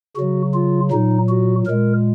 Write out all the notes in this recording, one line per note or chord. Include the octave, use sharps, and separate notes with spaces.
C#3 F#3 F#4
F4
A#2 F#3 D#4
F#4
A#2 G#3 A#4